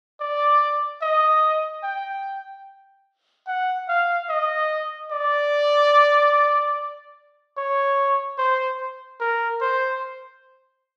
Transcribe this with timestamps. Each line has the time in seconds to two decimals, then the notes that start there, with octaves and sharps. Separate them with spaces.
0.20 D5
1.02 D#5
1.83 G5
3.47 F#5
3.89 F5
4.29 D#5
5.11 D5
7.57 C#5
8.38 C5
9.20 A#4
9.61 C5